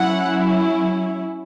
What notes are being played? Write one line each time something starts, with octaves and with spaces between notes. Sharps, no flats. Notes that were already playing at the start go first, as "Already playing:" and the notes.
Already playing: F#3 C#4 E4 F#5